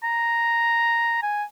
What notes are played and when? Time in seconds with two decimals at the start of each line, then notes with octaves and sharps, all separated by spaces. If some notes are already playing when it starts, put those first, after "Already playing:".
0.03 A#5
1.23 G#5